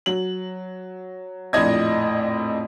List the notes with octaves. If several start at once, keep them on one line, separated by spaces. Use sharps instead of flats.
F#3 F#7
A#1 F2 A2 D5 D#5 G#6